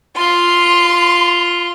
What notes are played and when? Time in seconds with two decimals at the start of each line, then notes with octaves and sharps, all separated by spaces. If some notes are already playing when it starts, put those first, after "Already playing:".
0.17 F4 C6